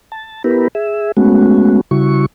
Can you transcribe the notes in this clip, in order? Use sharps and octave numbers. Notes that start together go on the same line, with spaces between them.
A5
B3 E4 G4 A#4 B4
G#4 E5
G#3 A3 B3 C#4 F#4
C#3 G3 E4 F#4 C#6